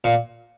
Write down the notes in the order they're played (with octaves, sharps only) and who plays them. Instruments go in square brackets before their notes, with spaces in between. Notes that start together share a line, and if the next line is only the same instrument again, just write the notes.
[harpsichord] A#2